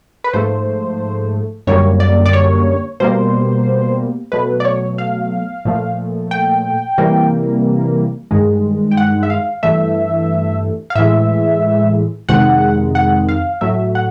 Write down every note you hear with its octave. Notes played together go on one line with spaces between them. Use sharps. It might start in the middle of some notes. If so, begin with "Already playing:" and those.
B4
G#2 F3 A3 C5
F#2 D3 G3 A#3 C#5
D5
D5
C#5
B2 G3 A#3 C5
B2 F#3 A3 B4
D5
C#5
F5
A#2 F3 A3
G5
C3 E3 G3 A#3
G2 D#3 G#3
G5
F#5
E5
F5
G2 E3 A3 E5
F5
A2 E3 G#3 E5
F2 C3 D#3 G#3 F#5
F#5
F5
A2 F#3 A3 E5
F#5